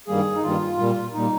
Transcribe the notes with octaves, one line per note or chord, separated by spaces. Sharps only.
G2 D#3 G3 A#3 G#4
D#4
G2 D#3 G3 A#3 F4
A#2 G3 A#3
A#2 G3 A#3 D#4